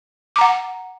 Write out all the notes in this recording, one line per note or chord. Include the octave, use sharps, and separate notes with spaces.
F#5 A#5 D6